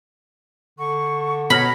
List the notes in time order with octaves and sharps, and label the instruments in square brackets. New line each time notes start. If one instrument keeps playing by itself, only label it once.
[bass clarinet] D3 [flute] C#6
[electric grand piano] B2 F6 A#6 [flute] C#5 [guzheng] B5